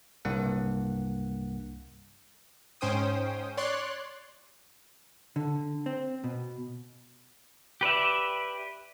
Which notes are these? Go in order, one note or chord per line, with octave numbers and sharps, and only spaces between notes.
C2 G2 A#3 F#5
G#2 C#4 C5 G5 D#6
C#5 D5 C6 F#6
D3
C4
B2
G4 B4 D5 E5